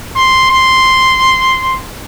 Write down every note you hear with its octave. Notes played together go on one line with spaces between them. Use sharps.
C6
C6